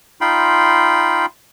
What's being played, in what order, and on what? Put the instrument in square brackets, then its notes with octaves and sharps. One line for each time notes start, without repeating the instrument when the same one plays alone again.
[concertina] D#4 F4 G5 B5 C6